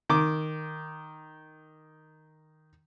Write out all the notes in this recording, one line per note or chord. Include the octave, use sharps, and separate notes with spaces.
D#3 D6